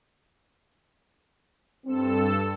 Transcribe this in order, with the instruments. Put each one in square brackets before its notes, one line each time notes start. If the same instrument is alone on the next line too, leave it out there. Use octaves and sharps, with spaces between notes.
[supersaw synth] G2 A4 E6 [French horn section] C4